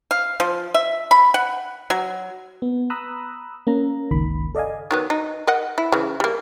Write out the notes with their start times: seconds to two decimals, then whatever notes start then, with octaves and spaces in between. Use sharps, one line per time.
0.11 F5
0.40 F3
0.74 E5
1.11 B5
1.34 F#5
1.90 F#3
2.62 B3
2.90 A#5 B5 D#6 E6 F#6
3.67 A#3 C#4 A#5
4.11 G1 C#2 D#3 B5
4.55 A4 D5 D#5 F5 G#5
4.91 D#3 F#3 B3
5.10 D#4
5.47 A#4 D#5 F#5
5.78 E4
5.92 C#3 E3
6.20 G3 A#3